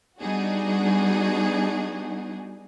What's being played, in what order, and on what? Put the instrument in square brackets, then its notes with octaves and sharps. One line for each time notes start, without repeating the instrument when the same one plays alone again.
[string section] G3 B3 D4 D#4 F#4 G#4